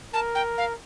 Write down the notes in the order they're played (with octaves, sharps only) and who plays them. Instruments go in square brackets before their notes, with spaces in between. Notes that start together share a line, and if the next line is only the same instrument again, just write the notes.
[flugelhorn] A#4 [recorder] A5
[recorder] G5
F5